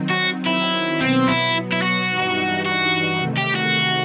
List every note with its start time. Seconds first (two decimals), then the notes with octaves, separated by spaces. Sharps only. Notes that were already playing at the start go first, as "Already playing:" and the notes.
Already playing: D#3 F#3 C4 D#4
0.10 F#4
0.46 E4
1.00 B2 F#3 B3 C4
1.28 E4
1.73 E4
1.82 F#4
2.10 G2 E3 G3 D#4
2.66 F#4
3.19 C3 D#3 A3
3.38 G4
3.56 F#4